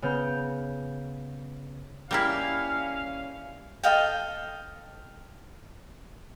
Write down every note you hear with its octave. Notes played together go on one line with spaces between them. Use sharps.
C#3 B3 F6 G6
G3 A#3 C#4 E4 F5
A4 D#5 F5 G5